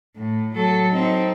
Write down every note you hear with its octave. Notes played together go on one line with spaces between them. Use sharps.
A2
F#3 A4
C4 D#4